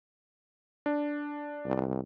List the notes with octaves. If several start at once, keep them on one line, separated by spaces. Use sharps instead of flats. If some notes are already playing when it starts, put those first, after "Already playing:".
D4
C2